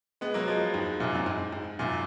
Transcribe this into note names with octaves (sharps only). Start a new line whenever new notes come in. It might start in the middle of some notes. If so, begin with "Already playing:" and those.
G#3 B3
F#3 A#3
F3 G#3
G#2
F#2 A#2
F#2
G#2
G#2
F#2 A#2